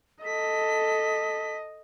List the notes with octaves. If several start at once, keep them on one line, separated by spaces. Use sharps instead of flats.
A4 D#5 B6